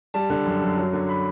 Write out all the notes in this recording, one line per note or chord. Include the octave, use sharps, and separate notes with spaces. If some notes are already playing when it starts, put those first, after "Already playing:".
G3 A5
D3
F#2
F#2
F#3
D3
B5